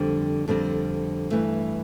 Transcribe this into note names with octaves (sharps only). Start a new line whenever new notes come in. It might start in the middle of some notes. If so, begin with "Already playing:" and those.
Already playing: F2 D3 G3 C4
F2 D3 G3 C4
G2 E3 A3